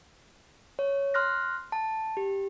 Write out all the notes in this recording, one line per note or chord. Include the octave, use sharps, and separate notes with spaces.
C#5
C6 F6 F#6 A#6
A5
G4